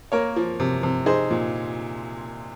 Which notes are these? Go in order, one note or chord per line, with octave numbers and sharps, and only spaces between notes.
A#3 A#4 C#5
F3
C3
C3
D#4 G#4 C5
A#2